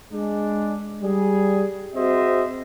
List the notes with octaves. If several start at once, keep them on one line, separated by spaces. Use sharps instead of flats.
G#3 D4
G3 G#4
C4 F#4 G#4 C5 D#5 E5